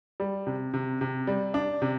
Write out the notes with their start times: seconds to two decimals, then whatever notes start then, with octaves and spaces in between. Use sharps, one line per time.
0.20 G3
0.47 C3
0.74 C3
1.01 C3
1.27 G3
1.54 D4
1.82 C3